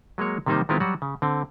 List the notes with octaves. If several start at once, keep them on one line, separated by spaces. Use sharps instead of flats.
F#3 G#3 A#3 C#5
C3 D#3 G3 A#3 D#4 C5
D#3 G#3 B3 C4 E4 F4
F#3 G3 F#4 F#5
C#3
D3 C4